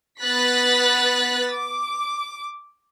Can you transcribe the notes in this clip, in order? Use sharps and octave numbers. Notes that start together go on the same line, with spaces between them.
B3 B4 F#6 A6 B6
D6